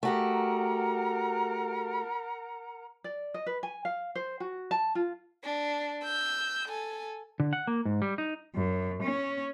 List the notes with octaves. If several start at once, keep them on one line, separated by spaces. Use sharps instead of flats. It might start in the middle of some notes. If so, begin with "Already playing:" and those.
A3 F#4 G4 A#4 F#5 A#5
D5
D#5
B4
G#5
F5
C5
F#4
A5
F4
D4
E6 G6
A4 G#5
D3
F#5
A#3
G#2
G3
D#4
F#2
C#4